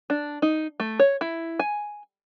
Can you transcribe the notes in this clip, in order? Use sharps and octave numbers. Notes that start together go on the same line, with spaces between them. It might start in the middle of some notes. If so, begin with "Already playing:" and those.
D4
D#4
A3
C#5
E4
G#5